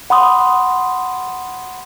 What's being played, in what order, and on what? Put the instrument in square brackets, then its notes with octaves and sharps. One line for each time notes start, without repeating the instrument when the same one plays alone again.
[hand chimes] F#5 B5 C6 D#6